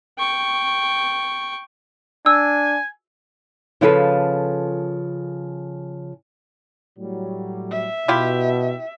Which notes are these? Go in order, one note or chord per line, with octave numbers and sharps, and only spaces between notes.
G5 C#6
D4 G#5 E6
C#3 F3 E4 F4 A4 B4
A2 F#3 G3
E5
B2 E4 F4 G4